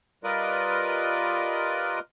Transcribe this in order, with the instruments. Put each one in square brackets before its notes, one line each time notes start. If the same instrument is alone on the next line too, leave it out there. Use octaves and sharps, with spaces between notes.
[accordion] G3 F4 A#4 B4 D5 D#5